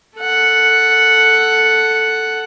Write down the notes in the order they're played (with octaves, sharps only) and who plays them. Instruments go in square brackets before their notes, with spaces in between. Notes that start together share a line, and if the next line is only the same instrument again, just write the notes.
[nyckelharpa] A4 F#5